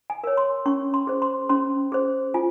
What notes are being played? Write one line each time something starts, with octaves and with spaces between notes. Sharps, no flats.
G#5
A#4 C#5
C6
C#4 C#6
C6
G#4 C5
C6
C#4 C6
G#4 C5
F4 G#5